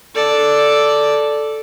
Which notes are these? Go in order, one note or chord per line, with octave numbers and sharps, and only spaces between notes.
A4 D5